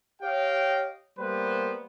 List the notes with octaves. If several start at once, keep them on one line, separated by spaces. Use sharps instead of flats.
G4 C#5 D#5 F5 G5
G3 A#3 B3 B4 C5